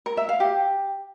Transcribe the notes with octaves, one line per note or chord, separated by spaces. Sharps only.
A#4
E5
F5
G4